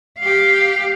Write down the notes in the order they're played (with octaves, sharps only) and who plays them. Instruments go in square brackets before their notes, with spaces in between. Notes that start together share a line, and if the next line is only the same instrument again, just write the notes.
[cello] G4 F5